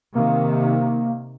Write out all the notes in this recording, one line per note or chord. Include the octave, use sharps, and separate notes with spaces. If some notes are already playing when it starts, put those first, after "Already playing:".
C3 D#3 A#3